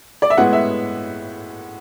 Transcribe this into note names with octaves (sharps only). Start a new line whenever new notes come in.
D5
E5
A2 G#3 B3 E4 F#5
E5